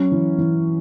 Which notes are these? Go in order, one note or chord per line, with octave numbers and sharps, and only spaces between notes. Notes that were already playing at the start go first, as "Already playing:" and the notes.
Already playing: F#3 C#4
E3
E3